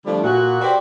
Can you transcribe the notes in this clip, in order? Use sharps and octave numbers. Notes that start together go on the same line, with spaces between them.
D3 F3 G3 A3 C4 D4
A#2 F#4
F#4 G4 B4 C5 D5